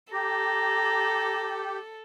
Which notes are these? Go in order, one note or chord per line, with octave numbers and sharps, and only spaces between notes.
G4 A4 A#5